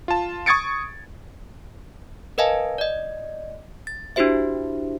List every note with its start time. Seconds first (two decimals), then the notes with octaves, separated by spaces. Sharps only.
0.08 F4 A5
0.46 C#6 D#6 G#6 A6 C#7 D7
2.38 A#4 B4 D#5 F5 G#5 A5
2.78 D5 D#5
3.87 A6
4.16 D4 E4 F#4 G4 C5 E5